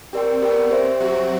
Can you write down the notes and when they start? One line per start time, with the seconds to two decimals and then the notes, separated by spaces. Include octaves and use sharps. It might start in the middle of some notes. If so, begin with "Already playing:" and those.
0.13 C4 G4 A#4 D5 G5
0.42 B3 G4 A#4 D5 G5
0.71 C4 G4 C5 E5
1.00 F#3 F#4 G4 C5 E5